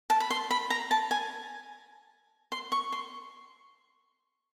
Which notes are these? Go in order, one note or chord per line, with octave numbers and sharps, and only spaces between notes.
A5
B5
C6
B5
A#5
A5
G#5
C6
C#6
C6